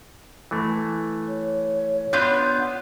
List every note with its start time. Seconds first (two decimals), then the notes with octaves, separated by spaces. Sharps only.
0.51 E3 A3
1.28 C#5
2.13 B3 D4 F4 G6